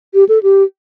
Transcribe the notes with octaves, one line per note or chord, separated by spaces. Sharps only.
G4
A4
G4